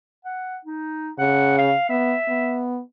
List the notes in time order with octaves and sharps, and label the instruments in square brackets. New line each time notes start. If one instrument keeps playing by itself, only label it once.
[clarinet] F#5
D#4
[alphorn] C#3 [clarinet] F#5
[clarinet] F5
[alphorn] B3 [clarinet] E5
[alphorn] B3